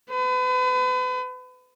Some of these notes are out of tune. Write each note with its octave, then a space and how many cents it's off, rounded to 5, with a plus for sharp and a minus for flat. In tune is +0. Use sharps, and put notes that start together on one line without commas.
B4 +35